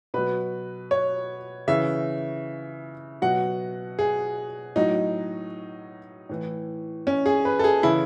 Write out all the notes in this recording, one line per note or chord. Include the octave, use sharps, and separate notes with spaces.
B2 F#3 B4
C#5
C#3 E3 E5
B2 F#3 F#5
G#4
A2 F#3 D#4
A2 E3
C#4
G#4
B4
A4
G#4
C#3 E3 E4